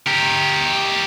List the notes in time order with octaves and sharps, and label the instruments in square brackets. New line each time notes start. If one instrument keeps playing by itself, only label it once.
[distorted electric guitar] G4 A#4